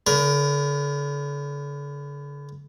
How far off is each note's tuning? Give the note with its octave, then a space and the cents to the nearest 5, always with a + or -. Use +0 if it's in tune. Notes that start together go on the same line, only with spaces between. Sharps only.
D3 -45 A#4 +25